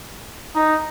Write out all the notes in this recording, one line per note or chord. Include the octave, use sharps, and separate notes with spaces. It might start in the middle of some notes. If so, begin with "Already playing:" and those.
D#4